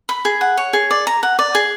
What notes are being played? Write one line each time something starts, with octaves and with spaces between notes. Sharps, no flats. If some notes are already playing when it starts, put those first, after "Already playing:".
B5
G#4
F#5
C#5
G#4
D5
A#5
F#5
D5
G#4